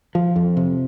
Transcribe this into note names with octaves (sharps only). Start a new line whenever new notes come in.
F3
F2
C3